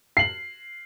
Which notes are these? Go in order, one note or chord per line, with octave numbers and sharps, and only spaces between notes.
C7 F#7